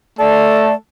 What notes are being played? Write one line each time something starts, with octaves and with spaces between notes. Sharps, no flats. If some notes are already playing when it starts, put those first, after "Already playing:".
A3 A4 D5